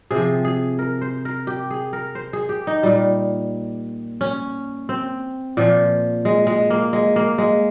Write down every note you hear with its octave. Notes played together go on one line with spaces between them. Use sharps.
C3 G#4
F3
G#4
A#4
C5
A#4
G4
G#4
A#4
C5
G#4
G4
D#4
A#2 G3
C#4
C4
A#2 F3
G#3
G#3
A#3
G#3
A#3
G#3